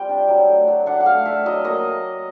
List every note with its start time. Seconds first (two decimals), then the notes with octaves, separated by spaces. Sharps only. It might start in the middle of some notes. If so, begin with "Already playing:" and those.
Already playing: G3 C4 F4 G5
0.09 D4
0.29 F#3
0.48 A3
0.68 F#3
0.86 D4 F#5
1.00 F#5
1.06 A3 F5
1.25 A3 E5
1.46 F#3 D#5
1.65 A#3 D#5